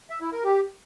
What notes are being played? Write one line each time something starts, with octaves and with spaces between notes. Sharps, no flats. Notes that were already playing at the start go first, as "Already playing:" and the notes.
E5
E4
A#4
G4